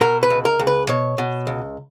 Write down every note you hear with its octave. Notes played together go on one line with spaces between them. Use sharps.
B2 A#4
B4
C#2
A#4
C#2
B4
B2 C#5
B2
C#2